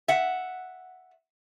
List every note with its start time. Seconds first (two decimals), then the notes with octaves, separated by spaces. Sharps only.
0.08 E5 F#5